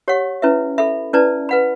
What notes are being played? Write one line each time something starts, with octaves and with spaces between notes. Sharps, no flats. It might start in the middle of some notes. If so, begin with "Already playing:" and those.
G4 C#5 F#5 C#6
C#4 E4 B4 E5
A4 E5 B5
C#4 E4 B4 D5 A5
B4 F#5 B5